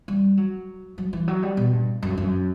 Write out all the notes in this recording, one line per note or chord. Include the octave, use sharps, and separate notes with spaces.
G3
F#3
F#3
E3
F#3
G3
B2
G2
F#2
F#2